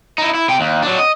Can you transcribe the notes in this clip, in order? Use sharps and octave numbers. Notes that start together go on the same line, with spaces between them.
D#4 E4
E4
C3 G5
D#2
F#3 D4
D#5